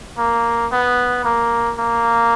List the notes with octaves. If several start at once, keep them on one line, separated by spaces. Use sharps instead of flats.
A#3
B3
A#3
A#3